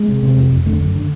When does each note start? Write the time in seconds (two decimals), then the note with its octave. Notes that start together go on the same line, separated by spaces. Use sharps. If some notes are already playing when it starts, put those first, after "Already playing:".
Already playing: G#3
0.08 C3
0.23 C3
0.37 F2
0.52 F2
0.66 D3 A3
0.81 F#2
0.95 D3